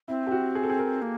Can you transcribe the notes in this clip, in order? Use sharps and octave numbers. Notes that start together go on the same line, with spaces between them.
C4 E4
G4
F#4
G#4
A4
G#4
A#4
A#3